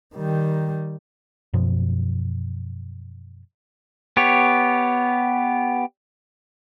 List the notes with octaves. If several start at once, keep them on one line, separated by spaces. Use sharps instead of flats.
D#3 G3
F#2 B2 F3
B3 G4 C#5